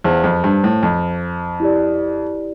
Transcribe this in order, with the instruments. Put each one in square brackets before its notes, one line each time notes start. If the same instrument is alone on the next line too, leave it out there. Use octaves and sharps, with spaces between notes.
[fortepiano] E2 [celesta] C5 F5 A5
[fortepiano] F2
G2
A2
F2
[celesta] E4 G4 D5